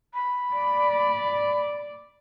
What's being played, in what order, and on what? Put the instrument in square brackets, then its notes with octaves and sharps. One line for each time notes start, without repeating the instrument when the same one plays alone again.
[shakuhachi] B5
[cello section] D5